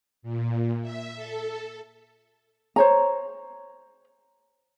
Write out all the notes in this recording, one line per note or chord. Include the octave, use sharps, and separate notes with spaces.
A#2
E5
A4
C5 C#5 A#5